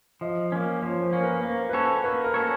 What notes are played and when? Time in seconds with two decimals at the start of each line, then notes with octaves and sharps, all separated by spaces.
0.21 F3 D#5
0.52 A#3 C#4
0.82 F3 C#5
1.02 C5
1.13 A#3 C#4
1.23 B4
1.43 A#3 C5
1.69 B4
1.73 C#4 F#4 A4 C5 C#5
2.04 A#3 B4
2.24 A#4
2.34 C#4 F#4 A4 C#5